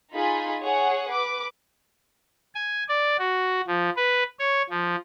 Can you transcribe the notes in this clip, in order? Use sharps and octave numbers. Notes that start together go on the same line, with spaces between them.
D#4 F4 G#4 G#5 B5
G#4 C#5 F#5
B4 D6
G#5
D5
F#4
F3
B4
C#5
F3